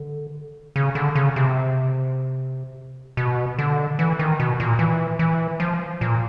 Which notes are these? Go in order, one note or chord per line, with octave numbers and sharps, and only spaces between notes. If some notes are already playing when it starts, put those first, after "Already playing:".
Already playing: D3
C#3
D3
C#3
C3
B2
D3
E3
D#3
B2
A#2
E3
E3
F3
A#2